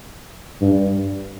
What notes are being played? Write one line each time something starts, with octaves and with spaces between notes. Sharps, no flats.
G2